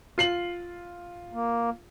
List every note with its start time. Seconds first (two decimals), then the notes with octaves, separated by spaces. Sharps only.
0.18 F4 C7 F#7
1.33 A#3